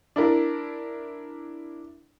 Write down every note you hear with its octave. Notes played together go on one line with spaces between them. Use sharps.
D4 E4 A#4